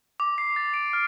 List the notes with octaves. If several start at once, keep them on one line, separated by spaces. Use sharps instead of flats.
D6
C7
A6
D7
F6